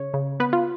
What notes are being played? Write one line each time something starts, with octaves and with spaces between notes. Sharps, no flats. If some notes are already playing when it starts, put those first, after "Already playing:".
Already playing: C#3 C#5
C#3
B3 B4
F4